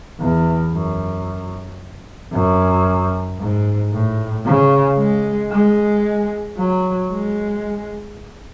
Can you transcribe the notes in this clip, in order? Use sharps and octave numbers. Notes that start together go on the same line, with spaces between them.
E2
F#2
F#2
G#2
A2
C#3
G#3
G#3
F#3
G#3